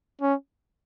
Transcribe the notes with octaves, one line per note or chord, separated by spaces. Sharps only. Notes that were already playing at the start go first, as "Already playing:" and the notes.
C#4